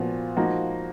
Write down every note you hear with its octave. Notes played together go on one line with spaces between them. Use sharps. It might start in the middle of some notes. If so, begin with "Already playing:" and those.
Already playing: A#2 F3 B3 F#4
F3 A#3 D#4 F#4